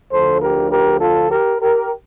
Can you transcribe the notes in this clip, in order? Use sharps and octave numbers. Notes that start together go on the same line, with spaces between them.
D2 D3 F3 A4 C5
G4 A#4
G4 A#4
F4 A4
G4 A#4
G4 A#4